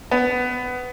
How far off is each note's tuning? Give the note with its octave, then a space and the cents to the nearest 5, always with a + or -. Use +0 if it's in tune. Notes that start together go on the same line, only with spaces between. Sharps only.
B3 +15